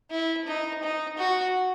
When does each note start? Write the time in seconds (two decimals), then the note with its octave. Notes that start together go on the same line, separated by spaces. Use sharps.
0.11 E4
0.47 D#4
0.82 D#4
1.18 F#4